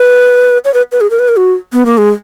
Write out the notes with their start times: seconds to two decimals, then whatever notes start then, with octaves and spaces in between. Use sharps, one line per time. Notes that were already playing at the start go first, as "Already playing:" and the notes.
Already playing: B4
0.65 C#5
0.74 B4
0.92 B4
1.01 G#4
1.10 A#4
1.19 B4
1.29 A#4
1.37 F#4
1.73 B3
1.86 A#3
1.98 G#3